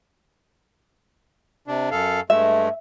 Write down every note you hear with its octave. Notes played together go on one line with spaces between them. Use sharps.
C3 D4
F#2 A4 F5
G2 G#3 A3 E5